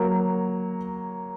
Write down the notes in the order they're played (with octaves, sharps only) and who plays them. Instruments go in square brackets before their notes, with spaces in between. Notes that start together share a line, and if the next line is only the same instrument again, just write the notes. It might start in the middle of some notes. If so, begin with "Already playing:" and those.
Already playing: [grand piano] F#3 A#3